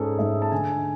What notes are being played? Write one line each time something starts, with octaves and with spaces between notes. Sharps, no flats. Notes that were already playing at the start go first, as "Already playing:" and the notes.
Already playing: G#2 G#3 C#4 G#4 A4
G#2 E5
A5
D3 G#5